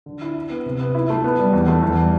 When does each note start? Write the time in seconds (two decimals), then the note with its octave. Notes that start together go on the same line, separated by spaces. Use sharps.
0.06 D3
0.22 E4
0.35 D4
0.50 B3
0.66 C3
0.79 B3
0.95 E4
1.10 A3
1.24 B3
1.39 G3
1.53 E2
1.68 A3
1.82 E2
1.98 G3